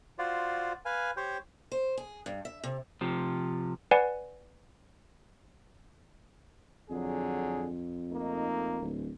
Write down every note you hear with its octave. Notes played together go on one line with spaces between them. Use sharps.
F4 F#4 C5 D5
B4 F5 G#5
G4 C5 C#5 G5
C5
G#4
G2
E5
C3
C3 F3
B4 D5 F#5 G#5
F2 D3 F#3 G#4
A3 A#3 D#4
D1